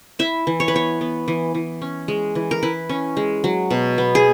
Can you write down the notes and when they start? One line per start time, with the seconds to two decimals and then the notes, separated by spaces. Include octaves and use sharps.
0.19 E4 E5
0.47 E3
0.60 C#5
0.68 B4
0.74 B3 C#5
1.01 B3
1.28 E3
1.55 E3
1.82 C#4
2.08 G#3
2.35 E3
2.51 A#4
2.63 E4 B4
2.89 C#4
3.17 G#3
3.44 F#3
3.71 B2
3.98 B3
4.15 G#4